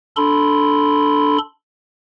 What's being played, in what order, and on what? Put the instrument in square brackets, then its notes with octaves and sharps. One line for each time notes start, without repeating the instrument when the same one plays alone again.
[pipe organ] D4 A4 B5 C6